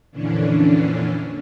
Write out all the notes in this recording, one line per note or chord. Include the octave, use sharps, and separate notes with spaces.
F2 A#2 D3 E3 C#4 D4